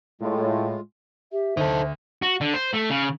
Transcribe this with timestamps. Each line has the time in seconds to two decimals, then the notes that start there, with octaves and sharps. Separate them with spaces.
0.21 A2 G#3 F4
1.32 G4 E5
1.57 D2 D#4 A4 C5
2.22 F#4
2.41 D3
2.54 C5
2.74 A3
2.90 C#3